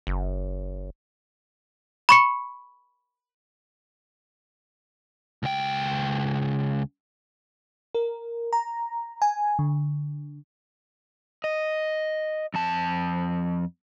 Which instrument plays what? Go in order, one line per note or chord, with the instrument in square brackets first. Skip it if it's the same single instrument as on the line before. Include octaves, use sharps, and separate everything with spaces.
[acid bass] F#1
[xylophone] B5 C#6 C#7
[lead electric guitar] C#2 G5
[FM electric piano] A#4
A#5
G#5
D3
[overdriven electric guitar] D#5
F2 A5